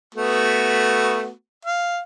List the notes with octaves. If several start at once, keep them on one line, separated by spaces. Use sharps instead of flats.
A3 B3 F#4
F5